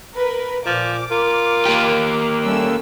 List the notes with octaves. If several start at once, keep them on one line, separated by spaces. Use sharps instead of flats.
A#4 B4
A#2 F3 D6
F4 A#4
A#3 G4
G3 A3 C#4 E6